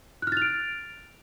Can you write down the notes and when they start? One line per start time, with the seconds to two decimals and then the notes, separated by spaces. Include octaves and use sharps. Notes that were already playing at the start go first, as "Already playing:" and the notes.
0.22 F#6
0.27 F6
0.32 A6
0.37 F7
0.42 D7